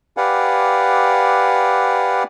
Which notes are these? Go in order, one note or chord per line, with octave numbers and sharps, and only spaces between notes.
G4 B4 D5 F5 F#5 G#5